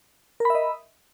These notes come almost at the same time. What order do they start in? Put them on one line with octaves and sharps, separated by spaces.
A#4 B5 E5 D#5